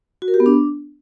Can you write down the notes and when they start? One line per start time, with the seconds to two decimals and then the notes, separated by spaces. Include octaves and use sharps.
0.22 F#4
0.28 A#4
0.34 G4
0.40 B3
0.46 D4